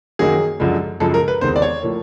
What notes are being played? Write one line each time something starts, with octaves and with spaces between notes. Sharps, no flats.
F#2 D#3 F#3 A#3 G#4
F#2 D3 F3 G#3
F#2 C#3 F3 G#3 A4
A#4
B4
E2 C3 D#3 G#3 C4 C5
D5
C#5
A2 F3 A#3